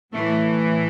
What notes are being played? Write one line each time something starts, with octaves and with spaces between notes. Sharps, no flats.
A2 E3 A3